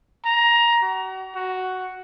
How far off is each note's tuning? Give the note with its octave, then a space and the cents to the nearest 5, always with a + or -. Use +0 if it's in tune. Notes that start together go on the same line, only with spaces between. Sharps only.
A#5 +15
F#4 +35
F#4 +5